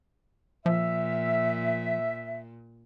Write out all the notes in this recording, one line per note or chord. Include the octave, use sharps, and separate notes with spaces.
A#2 F3 E5